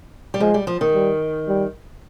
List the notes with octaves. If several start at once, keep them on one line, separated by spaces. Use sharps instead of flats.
G3
F3 G#3
G3
F3
D#3
G3
G3